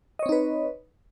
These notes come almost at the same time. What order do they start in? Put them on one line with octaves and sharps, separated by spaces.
D#5 C#5 C4 D#4 B4